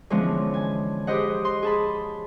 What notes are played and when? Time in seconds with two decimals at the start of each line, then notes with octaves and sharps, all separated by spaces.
0.10 D3 E3 F3 G#3 B3 C#4
0.54 G#5
1.07 G4 G#4 B4 C5 D#5 F#5
1.45 C6
1.62 G#4 A5 B5